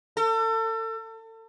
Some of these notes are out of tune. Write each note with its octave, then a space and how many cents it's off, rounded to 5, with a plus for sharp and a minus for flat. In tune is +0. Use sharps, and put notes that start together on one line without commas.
A4 +35